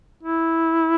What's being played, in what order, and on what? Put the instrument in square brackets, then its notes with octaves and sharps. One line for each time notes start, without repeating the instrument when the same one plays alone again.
[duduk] E4